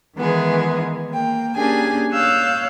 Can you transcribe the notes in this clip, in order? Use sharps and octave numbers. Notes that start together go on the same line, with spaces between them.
D#3 E3 G#3 B3 G#4
A#3 G5
A#3 C#4 D4 G4 G#4 G#5
C#5 F5 E6 F#6 G6